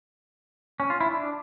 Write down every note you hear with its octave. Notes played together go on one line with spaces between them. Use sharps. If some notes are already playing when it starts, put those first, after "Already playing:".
C#4
F4
E4
D4